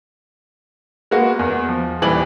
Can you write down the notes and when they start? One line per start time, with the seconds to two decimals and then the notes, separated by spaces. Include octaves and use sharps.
1.11 G#3 A#3 B3 F#4
1.39 E2
1.69 F3
2.02 D#1 E3 G3 F#7